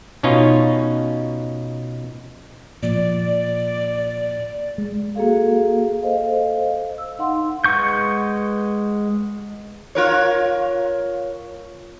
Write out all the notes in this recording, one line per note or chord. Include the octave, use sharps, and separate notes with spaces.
B2 C#4 D#4 F4
A#2 F3 D5
G#3
A#3 F#4 G#4 A4 F5
A4 C5 D#5 F5
E6
D#4 F5 F#5 C6
G#3 B4 F#5 C#6 G6
F4 A#4 C#5